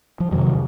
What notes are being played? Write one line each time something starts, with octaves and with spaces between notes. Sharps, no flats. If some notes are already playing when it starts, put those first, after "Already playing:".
F3
F2 C3 D#3 F#3